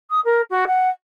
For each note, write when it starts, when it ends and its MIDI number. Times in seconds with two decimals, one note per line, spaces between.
0.10 0.20 87
0.25 0.41 70
0.50 0.65 66
0.67 0.89 78